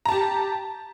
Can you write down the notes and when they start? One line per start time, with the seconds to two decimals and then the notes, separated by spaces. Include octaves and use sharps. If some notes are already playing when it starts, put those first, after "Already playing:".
0.05 A#5
0.09 A5
0.12 G4